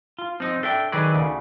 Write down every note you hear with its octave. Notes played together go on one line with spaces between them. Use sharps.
F4
F3 C4 D#4
D4 A4 E5 G5
D#3 F#3 G#4 B4 D5
D2 C#3